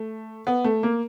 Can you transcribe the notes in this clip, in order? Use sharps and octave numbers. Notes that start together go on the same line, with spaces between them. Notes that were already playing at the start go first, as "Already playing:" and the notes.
Already playing: A3
B3
A3
A#3